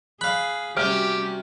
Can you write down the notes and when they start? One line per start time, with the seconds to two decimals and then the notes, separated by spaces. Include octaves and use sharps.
0.21 G#4 F5 B5 F#6
0.77 C3 G3 C#4 F#4 G4 F6 D7